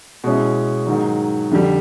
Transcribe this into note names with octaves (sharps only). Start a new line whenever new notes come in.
B2 G#3 C#4 E4
G#2 D#3 F#3
F2 D3 G3